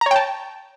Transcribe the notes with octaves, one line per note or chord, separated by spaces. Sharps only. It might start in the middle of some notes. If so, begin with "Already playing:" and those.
C#5 G5 A5 A#5